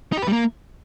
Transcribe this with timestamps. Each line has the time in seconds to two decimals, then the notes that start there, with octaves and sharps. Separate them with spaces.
0.12 D#4
0.17 G4
0.22 B4
0.27 G3
0.33 A#3